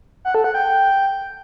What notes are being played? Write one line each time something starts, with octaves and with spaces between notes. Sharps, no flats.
F#5
A4
F#5
G5